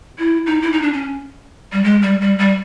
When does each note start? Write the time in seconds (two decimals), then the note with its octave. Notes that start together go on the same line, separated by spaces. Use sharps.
0.19 E4
0.46 D#4
0.62 E4
0.72 D#4
0.82 D4
0.93 C#4
1.72 G3
1.84 G#3
2.02 G3
2.21 G3
2.39 G3